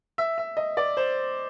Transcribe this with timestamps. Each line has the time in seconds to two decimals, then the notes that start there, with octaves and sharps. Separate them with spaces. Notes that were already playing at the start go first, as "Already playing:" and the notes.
0.18 E5
0.38 E5
0.57 D#5
0.77 D5
0.97 C5